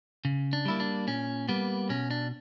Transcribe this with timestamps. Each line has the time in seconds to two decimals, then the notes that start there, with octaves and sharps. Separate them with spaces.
0.25 C#3
0.53 D4
0.65 G3 A#3 E4
0.80 D4
1.07 A#2 C#4
1.49 G3 A#3 B3
1.89 B2 C#4
2.11 D4